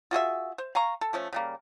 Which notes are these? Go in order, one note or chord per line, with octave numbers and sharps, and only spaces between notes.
F4 F#4 G#4 E5
C5
F5 G#5 A#5 C#6
A4
F3 A3 C#4
C#3 G3 A#3